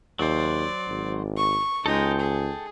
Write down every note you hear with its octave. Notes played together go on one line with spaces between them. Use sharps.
D#2 F#3 C5 D5
G#1
C#6
C#2 G#3 D#4 A4 G5
G#4